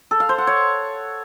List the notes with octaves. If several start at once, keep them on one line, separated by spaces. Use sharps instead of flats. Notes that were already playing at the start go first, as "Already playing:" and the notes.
A4
F5
C5
F#5
C#5